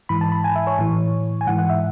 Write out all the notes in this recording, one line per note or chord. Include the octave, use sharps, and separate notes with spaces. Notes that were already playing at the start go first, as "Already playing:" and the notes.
G#2 E3 B5
A5
B5
G#5
E5
C#5
A2 E3
G#5
G#2 E3 F#5
F#5
E5